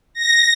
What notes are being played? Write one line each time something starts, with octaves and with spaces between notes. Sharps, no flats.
A#6